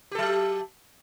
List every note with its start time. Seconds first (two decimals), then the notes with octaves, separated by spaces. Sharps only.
0.11 G4
0.15 A4
0.18 F#3